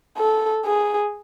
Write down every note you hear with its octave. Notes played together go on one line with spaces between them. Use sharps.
A4
G#4